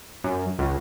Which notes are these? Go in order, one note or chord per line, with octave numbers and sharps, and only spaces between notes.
F#2
C#2